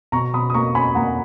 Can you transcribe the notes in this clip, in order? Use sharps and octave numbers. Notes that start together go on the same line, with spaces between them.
B2 A#5 C#6
B2 B5 D#6
D#6
A#3 A#5 C#6
C#4 G#5 B5
A#3 F#5 A#5